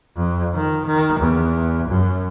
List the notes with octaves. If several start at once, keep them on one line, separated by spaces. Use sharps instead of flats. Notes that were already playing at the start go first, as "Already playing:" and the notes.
F2
D#3
D#3
E2
F#2